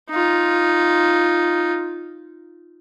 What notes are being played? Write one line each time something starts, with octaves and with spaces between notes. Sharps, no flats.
D#4 F4